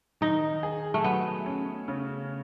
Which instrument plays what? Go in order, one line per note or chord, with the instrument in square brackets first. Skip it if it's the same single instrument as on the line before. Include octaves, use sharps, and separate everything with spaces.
[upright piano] D#3 [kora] D#4
[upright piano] G#4
[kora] A3
[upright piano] F#3 [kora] B3
[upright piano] C#4
C#3